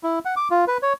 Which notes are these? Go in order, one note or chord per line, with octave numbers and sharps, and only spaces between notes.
E4
F#5
D6
F4
B4
C#5